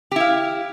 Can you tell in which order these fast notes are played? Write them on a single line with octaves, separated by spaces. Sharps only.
G4 E4 F5